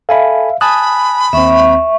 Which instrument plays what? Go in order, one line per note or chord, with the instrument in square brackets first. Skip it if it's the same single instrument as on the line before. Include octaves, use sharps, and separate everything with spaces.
[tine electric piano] A4 G#5 B5 [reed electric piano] E5 F5
[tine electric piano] G#5 A5 F#6 [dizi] B5 [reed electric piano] D#6
[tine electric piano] D#2 C4 [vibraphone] E5 C#6